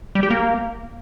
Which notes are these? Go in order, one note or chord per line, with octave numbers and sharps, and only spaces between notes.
G3
G4
A#3